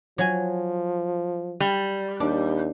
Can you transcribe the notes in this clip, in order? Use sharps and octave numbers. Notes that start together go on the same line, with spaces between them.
F3 F#3 G#5
G3
D#2 D4